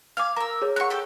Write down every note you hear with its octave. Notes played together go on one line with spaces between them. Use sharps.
F5 G#5 D6 F6
A#4 A#5 E6
G#4 C#5
F#5 A#5 C#6 F#6
G4 A4